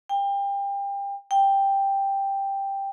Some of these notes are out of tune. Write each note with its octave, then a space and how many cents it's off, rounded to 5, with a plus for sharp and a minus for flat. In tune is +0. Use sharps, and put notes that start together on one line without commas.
G5 +30
G5 +5